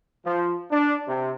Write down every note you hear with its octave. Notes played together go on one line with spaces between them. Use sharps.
F3
D4
C3